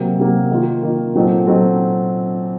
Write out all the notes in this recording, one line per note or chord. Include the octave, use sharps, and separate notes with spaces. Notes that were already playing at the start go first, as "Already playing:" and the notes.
Already playing: C3 F#3 A#3
C3 F#3 A#3
D#3 A#3 F4
D#3 A#3 F4
A#2 F#3 C4 D#4 A4
A#2 F#3 C4 D#4 A4